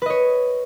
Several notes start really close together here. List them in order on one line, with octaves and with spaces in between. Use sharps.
B4 D#5 C#5